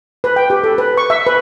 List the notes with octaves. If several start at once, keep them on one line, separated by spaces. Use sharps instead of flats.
B4
G5
G4
A4
B4
C#6
E5
B4